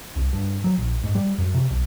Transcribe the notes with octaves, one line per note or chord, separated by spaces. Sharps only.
C2
G2
F#3
A#1
G#2
G3
F#2
C3
B1